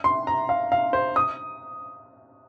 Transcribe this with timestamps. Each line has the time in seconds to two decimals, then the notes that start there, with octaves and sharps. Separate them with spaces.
0.04 C6
0.27 A#5
0.49 F5
0.72 F5
0.93 C5
1.16 D#6